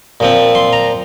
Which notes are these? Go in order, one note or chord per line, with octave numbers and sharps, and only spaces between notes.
A#2 F3 C4
C6
A#5